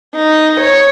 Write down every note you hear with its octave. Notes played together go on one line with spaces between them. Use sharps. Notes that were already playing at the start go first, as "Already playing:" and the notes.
D#4
C#5